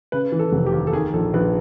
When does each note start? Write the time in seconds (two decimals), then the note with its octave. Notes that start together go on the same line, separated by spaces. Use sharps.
0.12 C#3 B4
0.32 E3
0.39 A4
0.52 F1
0.66 G4
0.72 D#2
0.87 A4
0.93 D#3 G#4
1.13 A#1 A4
1.33 A#1 B4